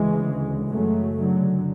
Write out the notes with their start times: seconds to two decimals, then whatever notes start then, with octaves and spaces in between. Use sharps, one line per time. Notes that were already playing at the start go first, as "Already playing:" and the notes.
Already playing: D2 C#3 E3 G#3
0.71 F#2 C#3 F#3 A3
1.19 D3 F#3